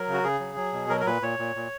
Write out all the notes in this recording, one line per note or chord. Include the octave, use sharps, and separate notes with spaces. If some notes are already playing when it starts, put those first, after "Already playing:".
Already playing: F#3 A#4
C#3
F#4
C#3 G#4
F#3
F#3
B2
F#3 A#4
A#4
A#2 B4
A#2 C#5
A#2
A#2